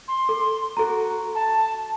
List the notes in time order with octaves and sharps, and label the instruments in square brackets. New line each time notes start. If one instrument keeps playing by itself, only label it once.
[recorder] C6
[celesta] A4
[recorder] F#4 [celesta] A4 A#5
[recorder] A5